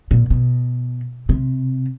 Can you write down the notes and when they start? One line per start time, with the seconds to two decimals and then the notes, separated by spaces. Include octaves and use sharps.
0.11 A#2
0.30 B2
1.29 C3